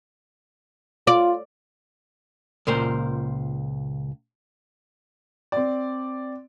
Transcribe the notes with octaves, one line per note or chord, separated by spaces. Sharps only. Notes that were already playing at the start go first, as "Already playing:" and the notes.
F4 D5
C#2 A#2 A#4 C5
C4 D5